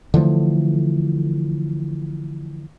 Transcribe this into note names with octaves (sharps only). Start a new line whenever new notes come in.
D3 E3 F3 A3